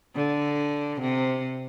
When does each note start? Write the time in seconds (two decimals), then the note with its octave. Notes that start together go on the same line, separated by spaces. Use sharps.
0.15 D3
1.00 C3